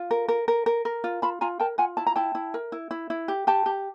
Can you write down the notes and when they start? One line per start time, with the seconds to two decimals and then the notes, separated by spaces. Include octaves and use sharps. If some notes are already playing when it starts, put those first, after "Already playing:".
Already playing: F4
0.11 A#4
0.28 A#4
0.48 A#4
0.66 A#4
0.85 A#4
1.04 F4
1.22 F4 A5 B5
1.41 F4 G#5 A#5
1.60 A#4 G5 A5
1.78 F4 F#5 G#5
1.97 E4 A5
2.07 A#5
2.16 E4 G5 A5
2.35 E4
2.54 A#4
2.72 E4
2.91 E4
3.10 E4
3.28 G4
3.47 G4 G5 A5
3.66 G4